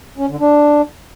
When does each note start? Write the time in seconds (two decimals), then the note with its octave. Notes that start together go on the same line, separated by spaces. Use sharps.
0.18 C#4
0.29 D3
0.40 D4